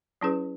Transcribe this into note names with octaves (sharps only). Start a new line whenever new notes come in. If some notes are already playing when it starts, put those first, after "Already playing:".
F#3 C#4 E4 G#4 B4